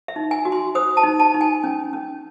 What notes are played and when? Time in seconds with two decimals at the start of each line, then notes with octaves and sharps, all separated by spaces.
0.08 E5
0.16 D#4
0.31 G#5
0.45 F#4
0.52 C6
0.75 C5 D#6
0.97 A5
1.04 D#4
1.20 A5
1.34 D#4
1.41 G#5
1.64 C#4
1.93 C#4